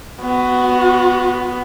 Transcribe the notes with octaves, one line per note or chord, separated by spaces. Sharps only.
B3 F#4